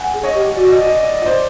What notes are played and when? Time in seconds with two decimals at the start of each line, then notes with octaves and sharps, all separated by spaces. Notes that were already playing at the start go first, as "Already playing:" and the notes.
Already playing: F#5 G#5
0.13 G#4
0.24 C#5 D#5
0.35 G4
0.56 F#4 D5
0.65 D#5
0.73 D5
0.82 D#5
0.91 D5
1.00 D#5
1.09 D5
1.18 F4 D#5
1.26 C5 D5